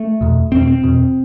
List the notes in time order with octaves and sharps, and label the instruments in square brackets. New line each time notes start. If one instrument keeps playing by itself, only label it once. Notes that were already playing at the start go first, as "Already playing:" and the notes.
Already playing: [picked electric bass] A3
E2 B2
E2 B2 C4
C4
E2 B2